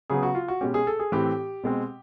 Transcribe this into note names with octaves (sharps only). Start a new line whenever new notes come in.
C#3 F#3 B3 G#4
F#4
F4
F#4
B2 G#3 C#4 G4
G#4
A4
G#4
A2 E3 A3 C4 G4
B2 G#3 C4